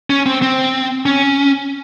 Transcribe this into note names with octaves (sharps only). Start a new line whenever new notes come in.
C#4
C4
C4
C#4